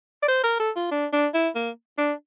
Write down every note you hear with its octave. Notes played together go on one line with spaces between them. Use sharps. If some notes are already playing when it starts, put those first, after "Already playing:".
D5
C5
A#4
A4
F4
D4
D4
E4
A#3
D4